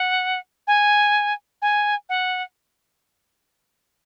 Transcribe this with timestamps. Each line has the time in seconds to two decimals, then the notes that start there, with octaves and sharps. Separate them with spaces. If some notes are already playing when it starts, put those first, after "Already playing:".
Already playing: F#5
0.67 G#5
1.62 G#5
2.09 F#5